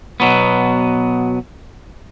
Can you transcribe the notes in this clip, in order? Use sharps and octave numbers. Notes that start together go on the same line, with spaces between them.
B2 F#3 B3